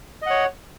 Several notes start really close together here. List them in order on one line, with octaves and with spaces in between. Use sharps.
D#5 F#5 C#5